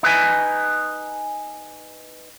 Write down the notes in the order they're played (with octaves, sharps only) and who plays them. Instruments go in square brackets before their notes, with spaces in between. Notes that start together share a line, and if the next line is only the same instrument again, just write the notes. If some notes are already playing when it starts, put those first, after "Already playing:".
[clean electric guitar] D#4 B4 G#5